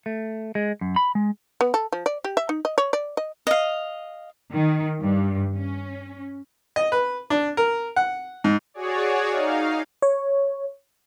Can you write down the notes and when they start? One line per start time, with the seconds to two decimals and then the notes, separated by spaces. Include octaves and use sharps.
0.06 A3
0.55 G#3
0.81 F#2
0.96 B5
1.15 G#3
1.61 B3
1.74 A4
1.92 F3
2.06 D5
2.24 G4
2.37 E5
2.49 D#4
2.65 D#5
2.78 C#5
2.93 D5
3.17 D#5
3.47 D#5 F5
4.53 D#3
5.01 G2
5.54 C#4
6.76 D#5
6.92 B4
7.30 D4
7.57 A#4
7.96 F#5
8.44 G#2
8.74 F#4 G#4 C#5 D5
9.30 D#4 F5
10.02 C#5